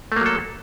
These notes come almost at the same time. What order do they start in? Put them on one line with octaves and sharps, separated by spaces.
A3 A#3 F#3 A4